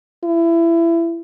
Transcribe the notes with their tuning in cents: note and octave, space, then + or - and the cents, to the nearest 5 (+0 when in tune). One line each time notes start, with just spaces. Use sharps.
E4 +25